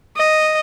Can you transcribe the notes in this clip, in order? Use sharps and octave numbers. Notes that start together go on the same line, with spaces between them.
D#5